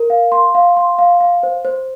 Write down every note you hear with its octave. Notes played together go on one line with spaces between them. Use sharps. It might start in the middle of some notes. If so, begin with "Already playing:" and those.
Already playing: A#4
F5
C6
F5
C6
F5
F5
C5
C5